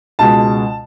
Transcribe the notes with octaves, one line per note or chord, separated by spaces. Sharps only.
C#2 B2 G#3 A5